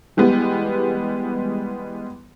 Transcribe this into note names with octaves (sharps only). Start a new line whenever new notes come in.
E3 G3 G#3 B3